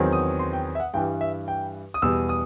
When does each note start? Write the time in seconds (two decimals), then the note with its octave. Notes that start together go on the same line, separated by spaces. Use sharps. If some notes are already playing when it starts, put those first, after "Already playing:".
Already playing: E2 D#3 F#3 C4
0.12 D#6
0.39 C6
0.53 G5
0.75 E5
0.80 F#5
0.94 G2 E3 G3 G5
1.21 E5
1.48 G5
1.94 D#6
2.02 E2 B2 G3 E6
2.29 D#6